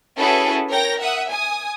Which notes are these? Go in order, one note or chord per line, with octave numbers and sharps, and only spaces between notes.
C#4 E4 F#4 G#4 A4 B4
A#4 C#5 G5 A#6
E5 F#5 D#6
G#5 D#6